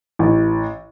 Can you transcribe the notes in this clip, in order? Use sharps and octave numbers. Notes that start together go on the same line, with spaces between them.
A1